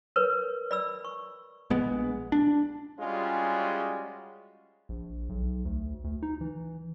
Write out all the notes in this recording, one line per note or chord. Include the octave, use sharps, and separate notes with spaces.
A#4 B4 C#5
D5 B5 E6
C#6
A#1 G#3 B3
D4
G3 G#3 C#4 F4 F#4 G#4
A#1
B1
D2
D2
D#4
E3